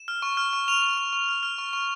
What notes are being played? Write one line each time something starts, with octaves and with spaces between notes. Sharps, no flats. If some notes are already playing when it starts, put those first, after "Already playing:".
Already playing: E7
F6
C#6
F6
C#6
C#6 F7
C#6
C#6
C#6
F6
F6
C#6
C#6